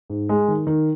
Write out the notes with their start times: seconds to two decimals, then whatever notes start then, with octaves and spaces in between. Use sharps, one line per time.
0.10 G#2
0.29 G#3
0.48 D#3
0.67 D#3